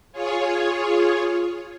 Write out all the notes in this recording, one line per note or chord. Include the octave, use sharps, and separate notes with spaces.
F4 G#4 C#5